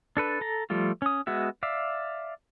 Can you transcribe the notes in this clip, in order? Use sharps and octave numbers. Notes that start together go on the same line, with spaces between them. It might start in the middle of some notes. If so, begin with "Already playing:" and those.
D4 A4 B4
A4 A#5
F3 G3 A3 F4
C#4 D#6
G#3 B3 F#4 E5
D5 E5 F5